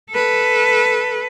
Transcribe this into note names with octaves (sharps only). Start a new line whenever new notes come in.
A4 B4